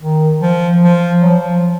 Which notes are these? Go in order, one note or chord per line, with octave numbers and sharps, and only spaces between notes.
D#3
F3
F3
F#3
F3